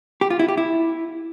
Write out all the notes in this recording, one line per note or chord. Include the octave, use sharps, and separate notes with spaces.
G4
F4
E4
G4
E4